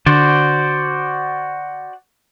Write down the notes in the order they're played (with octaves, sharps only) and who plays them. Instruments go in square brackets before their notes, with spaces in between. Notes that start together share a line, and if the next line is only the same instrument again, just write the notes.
[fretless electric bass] D3 [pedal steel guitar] F#4 C5 D5